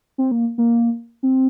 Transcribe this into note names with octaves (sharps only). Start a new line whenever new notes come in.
C4
A#3
A#3
C4